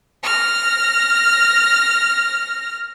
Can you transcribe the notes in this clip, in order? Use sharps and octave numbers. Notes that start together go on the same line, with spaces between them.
F6 A#6